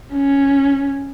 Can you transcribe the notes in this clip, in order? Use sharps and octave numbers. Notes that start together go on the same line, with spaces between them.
C#4